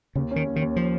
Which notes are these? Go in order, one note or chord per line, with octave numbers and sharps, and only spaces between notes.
D#2 C#3
D#3 C#4
D#2
D#3
D#2
F3